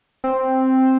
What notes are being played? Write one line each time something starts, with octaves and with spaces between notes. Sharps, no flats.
C4